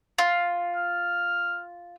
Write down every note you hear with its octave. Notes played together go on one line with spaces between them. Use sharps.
F4
F6